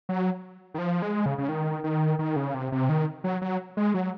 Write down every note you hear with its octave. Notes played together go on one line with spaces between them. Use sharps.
F#3
D#3
F3
G#3
C#3
C#3
D#3
D#3
D#3
C#3
C3
C3
D#3
F#3
F#3
G#3
F#3